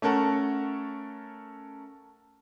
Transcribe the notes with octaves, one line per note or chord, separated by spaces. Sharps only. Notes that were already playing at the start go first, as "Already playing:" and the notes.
A3 C#4 A4 A#4 F#5